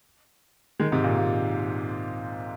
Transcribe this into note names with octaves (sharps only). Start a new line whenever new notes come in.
D#3 G#3
G#2 C3
A#2
A#2